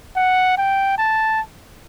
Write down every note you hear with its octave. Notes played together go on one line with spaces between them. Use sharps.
F#5
G5
A5